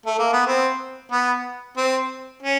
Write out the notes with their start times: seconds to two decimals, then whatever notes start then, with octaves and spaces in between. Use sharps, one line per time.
0.06 A3
0.19 A#3
0.33 B3
0.47 C4
1.12 B3
1.77 C4
2.43 C#4